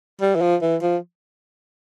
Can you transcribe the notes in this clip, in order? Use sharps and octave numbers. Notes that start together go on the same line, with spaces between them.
G3
E3
F3
E3
F3